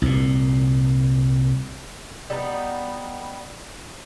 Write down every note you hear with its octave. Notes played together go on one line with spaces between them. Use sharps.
C2 A#2
G3 B3 D#4